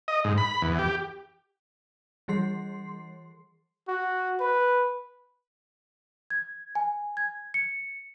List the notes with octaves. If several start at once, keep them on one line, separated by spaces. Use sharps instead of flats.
D#5
G#2
B5
E2
G4
E3 G3 G#4 C6 C7
F#4
B4
G#6
G#5
G#6
C#7